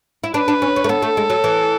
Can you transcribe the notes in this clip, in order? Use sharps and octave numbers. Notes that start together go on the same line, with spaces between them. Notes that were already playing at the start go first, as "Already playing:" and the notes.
E4
D4 B4
D4
C#4
C#4
A3
B3 A4
A3
G#3
F#3
E3